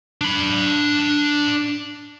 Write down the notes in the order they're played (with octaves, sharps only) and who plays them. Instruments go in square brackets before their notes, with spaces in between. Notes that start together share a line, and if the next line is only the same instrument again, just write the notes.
[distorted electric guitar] D4 B5